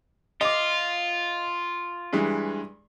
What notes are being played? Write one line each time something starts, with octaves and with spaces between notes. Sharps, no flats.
F4 D#5 D6
G2 E3 G#3